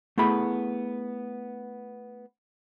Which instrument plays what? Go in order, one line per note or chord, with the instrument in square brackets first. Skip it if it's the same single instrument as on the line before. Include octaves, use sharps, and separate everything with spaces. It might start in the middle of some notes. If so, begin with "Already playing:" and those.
[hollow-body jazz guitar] A3 B3 E4 G#4 B5